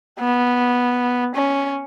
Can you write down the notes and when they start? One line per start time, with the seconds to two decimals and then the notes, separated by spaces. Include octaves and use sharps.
0.19 B3
1.35 C#4